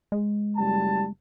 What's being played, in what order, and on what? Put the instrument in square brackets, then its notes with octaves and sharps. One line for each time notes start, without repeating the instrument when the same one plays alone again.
[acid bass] G#3
[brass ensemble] F#1 G3 A5